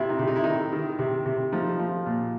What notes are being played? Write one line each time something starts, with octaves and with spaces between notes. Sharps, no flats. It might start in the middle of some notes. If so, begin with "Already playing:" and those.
Already playing: C3 E4 F4
D#4
C3
D#4
E4
D#3 D#4
D#3
C3
C3
F3 D#4
F3
A#2